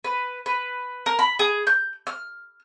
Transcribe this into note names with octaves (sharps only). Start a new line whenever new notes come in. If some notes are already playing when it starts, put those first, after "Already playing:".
B4
B4
A#4
B5
G#4
G6
F6